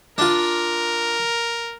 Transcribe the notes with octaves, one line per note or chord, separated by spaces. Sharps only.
D4 F4 A#4